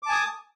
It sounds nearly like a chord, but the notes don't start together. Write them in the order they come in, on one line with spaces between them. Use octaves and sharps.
D6 A5 G#5 D#6